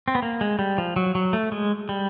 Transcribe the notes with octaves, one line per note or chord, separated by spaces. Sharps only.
C4
B3
A#3
G#3
G3
F3
F#3
F#3
A3
G#3
G3